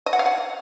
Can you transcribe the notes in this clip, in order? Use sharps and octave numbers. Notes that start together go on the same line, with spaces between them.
D#5
F#5
F5
F#5